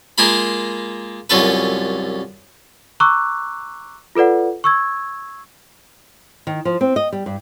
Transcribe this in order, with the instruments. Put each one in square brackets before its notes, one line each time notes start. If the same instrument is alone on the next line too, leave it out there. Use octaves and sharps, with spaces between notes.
[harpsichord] G#3 A#3 F4 A#4 B5
C2 F#2 F4 A4 B4
[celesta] A#5 C#6 D6 E6 F#6
F4 A4 B4 D5 F#5
C#6 E6 G#6
[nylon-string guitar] D#3
F3
C4
D#5
G3
G2